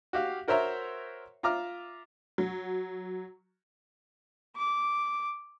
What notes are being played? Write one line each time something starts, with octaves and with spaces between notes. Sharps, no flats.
F#4 G4 F5
F#4 A#4 C5 C#5 E5 A#5
F4 E5 A#5 D6 F6
F#3
D6